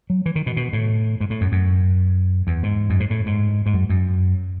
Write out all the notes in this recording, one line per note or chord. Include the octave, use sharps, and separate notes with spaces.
F#3
E3
D#3
B2
B2
A2
G#2
A2
F#2
F#2
E2
G#2
F#2
G#2
A2
G#2
G#2
F#2
F#2